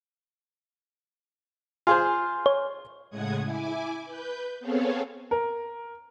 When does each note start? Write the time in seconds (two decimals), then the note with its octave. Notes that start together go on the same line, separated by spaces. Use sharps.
1.87 F4 G#4 C5 G#5 C6 F6
2.46 C#5
3.10 A2 C#3 G#3 F#5 D#6 G#6
3.44 E4 G#5 D6
4.05 B4 G6
4.60 B3 C4 G#4 A4 C#5 F5
5.31 A#4